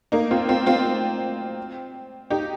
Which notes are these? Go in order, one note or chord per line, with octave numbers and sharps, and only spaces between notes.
A#3 D#4
C4 F4
C4 F4
C4 F4
D#4 G4